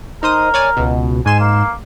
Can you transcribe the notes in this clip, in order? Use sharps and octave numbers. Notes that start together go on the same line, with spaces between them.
D#4 A#4 C5 D#6
C#5 D5 G#5
C#2 B2
G#2 G#5 C6 E7
A#3